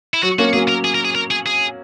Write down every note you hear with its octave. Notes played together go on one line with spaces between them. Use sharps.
E4
F#3 F#4
A#3 C#4 F#4
F#3 A#3 G#4
A#4
G#4
A#4
G#4
A#4
G#4
G#4